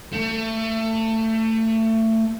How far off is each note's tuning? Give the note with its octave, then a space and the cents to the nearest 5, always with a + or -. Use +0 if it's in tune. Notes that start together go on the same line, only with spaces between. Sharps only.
A3 +25